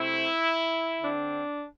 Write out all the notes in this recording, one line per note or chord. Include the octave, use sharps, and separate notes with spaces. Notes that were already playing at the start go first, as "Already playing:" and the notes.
Already playing: C3 A3 C4 E4
D3 C4 D4